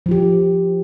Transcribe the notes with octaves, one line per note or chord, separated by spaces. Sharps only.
F3 F4 G4